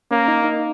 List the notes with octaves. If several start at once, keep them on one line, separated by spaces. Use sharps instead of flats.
A#3 C#4
D#4
D#4